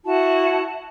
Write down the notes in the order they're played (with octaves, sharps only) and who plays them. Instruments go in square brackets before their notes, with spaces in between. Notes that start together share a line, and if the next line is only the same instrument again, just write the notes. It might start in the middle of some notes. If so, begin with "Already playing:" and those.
[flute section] E4 F#4 A5